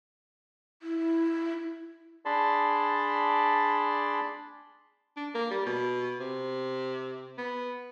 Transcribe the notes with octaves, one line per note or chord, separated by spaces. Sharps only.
E4
D4 G#4 D5 A5 B5 C6
D4
A#3
G3
B2
C3
B3